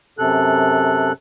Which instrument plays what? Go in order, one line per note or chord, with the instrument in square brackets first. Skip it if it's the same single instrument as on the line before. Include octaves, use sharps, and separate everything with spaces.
[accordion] F#2 C3 A4 F#6